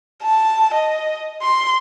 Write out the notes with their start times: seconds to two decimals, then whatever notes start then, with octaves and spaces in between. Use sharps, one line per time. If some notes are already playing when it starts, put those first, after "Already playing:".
0.23 A5
0.74 D#5
1.42 C6